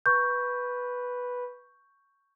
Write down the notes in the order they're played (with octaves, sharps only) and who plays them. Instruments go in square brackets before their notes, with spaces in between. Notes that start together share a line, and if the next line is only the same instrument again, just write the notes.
[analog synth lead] B4 [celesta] C#6 G6